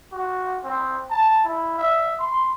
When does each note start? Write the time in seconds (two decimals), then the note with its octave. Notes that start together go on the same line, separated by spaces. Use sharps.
0.12 F#4
0.64 C4
1.10 A5
1.44 E4
1.78 E5
2.19 C6